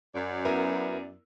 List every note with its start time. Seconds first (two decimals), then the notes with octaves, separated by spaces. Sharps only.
0.15 F#2 D5
0.45 B3 E4 A#4